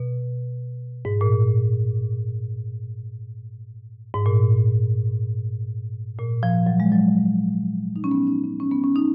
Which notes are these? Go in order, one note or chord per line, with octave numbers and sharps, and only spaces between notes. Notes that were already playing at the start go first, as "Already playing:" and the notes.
Already playing: B2
G#2
A#2
G#2
A#2
A#2
F3
F#3
G#3
F#3
D#4
C#4
B3
D#4
C#4
C#4
B3
C#4
D#4